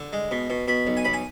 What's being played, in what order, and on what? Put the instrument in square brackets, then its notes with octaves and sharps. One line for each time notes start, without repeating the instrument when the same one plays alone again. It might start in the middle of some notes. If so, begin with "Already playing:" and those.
Already playing: [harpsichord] D3
G#3
B2
B2
B2 B5
B1
G#5
B1 B5
G#5